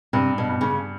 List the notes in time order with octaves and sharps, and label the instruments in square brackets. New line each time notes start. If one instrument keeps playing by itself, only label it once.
[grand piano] G2 [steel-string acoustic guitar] C3
[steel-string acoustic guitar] B2
[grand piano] G2
[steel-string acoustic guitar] C#3